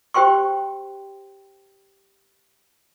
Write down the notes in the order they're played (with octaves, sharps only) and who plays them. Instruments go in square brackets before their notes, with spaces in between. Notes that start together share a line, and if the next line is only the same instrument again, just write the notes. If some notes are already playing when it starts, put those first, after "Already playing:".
[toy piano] G4 C5 G5 C6 C#6